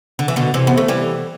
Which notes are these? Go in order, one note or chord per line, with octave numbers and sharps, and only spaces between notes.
D3
E3
B2 D3
C3 E3
B3
A3
E3 G3